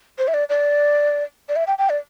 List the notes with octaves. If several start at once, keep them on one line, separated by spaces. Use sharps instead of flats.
C5
E5
D5
D5
D5
E5
G5
G5
D5